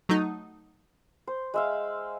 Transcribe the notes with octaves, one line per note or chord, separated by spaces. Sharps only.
F#3 A3 D#4
C5
G#3 E5 F5